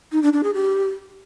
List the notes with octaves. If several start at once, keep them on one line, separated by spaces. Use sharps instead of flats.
D#4
D4
D4
G#4
G4